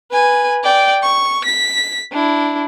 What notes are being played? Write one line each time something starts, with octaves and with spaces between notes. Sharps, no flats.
B4 G#5
D5 G5
C#6
B6
D4 E4